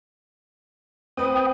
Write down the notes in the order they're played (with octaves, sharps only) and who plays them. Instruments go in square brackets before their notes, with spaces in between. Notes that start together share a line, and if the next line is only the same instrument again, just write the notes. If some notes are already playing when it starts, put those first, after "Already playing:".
[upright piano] C4 B4 [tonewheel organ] G5 D#6